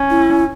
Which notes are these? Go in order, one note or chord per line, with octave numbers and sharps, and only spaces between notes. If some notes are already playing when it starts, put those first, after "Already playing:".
Already playing: C#4
E4